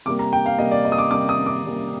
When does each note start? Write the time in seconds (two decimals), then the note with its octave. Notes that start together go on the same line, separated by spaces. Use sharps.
0.06 C3 G3 A#3 D6
0.19 A#5
0.33 G5
0.46 F5
0.58 C3 G3 A#3 D#5
0.71 D5
0.85 D#5
0.92 D#6
0.98 D6
1.11 C3 G3 A#3 D6
1.29 D#6
1.46 D6
1.64 C3 G3 A#3